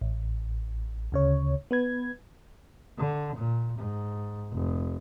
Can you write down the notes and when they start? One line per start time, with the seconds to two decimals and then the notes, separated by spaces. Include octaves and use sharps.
0.01 A1
1.12 D2 C#3 C#5
1.71 B3 B4 G#6
2.99 D3
3.36 A#2
3.78 G#2
4.52 F1